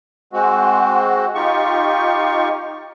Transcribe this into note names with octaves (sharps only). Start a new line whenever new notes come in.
G#3 C4 F#4
D#4 F4 G4 C#6